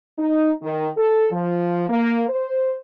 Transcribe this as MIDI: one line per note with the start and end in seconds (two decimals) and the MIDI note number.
0.19 0.51 63
0.62 0.88 51
0.97 1.26 69
1.32 1.86 53
1.89 2.24 58
2.29 2.75 72